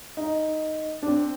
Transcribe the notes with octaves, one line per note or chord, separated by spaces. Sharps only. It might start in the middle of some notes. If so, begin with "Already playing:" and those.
D#4
D4
C4